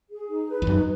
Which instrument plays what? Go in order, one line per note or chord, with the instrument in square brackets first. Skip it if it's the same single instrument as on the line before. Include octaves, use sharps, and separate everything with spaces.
[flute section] G#4
D#4
B4
[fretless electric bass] E2
[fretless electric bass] F#2 [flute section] D#4